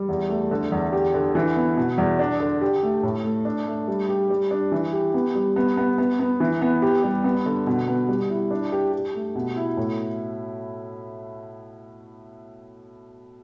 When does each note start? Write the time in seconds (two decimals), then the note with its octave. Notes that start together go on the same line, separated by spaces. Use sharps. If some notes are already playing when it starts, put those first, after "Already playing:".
Already playing: G3
0.09 E2
0.30 A3
0.51 D3
0.72 E2
0.93 G4
1.14 D3
1.35 E3
1.56 B3
1.77 B2
1.98 E2
2.19 D4
2.40 D3
2.61 G4
2.83 A3
3.03 A2
3.24 A3
3.45 D4
3.66 A3
3.88 G3
4.09 G4
4.30 G3
4.51 D4
4.72 E3
4.93 G4
5.14 B3
5.35 G3
5.56 B3
5.77 B3
5.98 B3
6.19 B3
6.40 E3
6.61 B3
6.82 G4
7.04 G3
7.24 B3
7.46 D3
7.67 B2
7.88 B3
8.09 G3
8.30 E4
8.51 D4
8.72 G4
8.93 G4
9.14 A3
9.35 B2
9.56 E4
9.77 A2